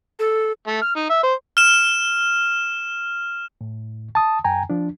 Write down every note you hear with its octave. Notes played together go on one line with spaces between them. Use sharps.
A4
A3
F6
D#4
E5
C5
F6 E7
A2
A5 D#6
F#2 G5 G#5 A#5
F3 D4